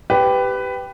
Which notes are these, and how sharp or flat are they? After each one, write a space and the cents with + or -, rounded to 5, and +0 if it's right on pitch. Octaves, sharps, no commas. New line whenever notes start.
G4 +0 B4 +15